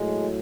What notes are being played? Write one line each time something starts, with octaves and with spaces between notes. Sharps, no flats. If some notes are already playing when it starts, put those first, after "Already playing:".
Already playing: A2 F#3 G#3